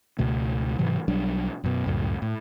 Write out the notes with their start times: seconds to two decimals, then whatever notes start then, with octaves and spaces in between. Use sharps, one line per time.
0.19 C#2 B2 A3
0.79 G#2 C3 E3 F#3
1.08 B1 F#3 G3 D4
1.64 F#2 B2
1.86 C#2 F#2 A2
2.22 A2